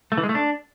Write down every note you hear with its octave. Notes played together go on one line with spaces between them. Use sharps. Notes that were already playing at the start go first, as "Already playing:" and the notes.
A3
E3
G#3
A3
D4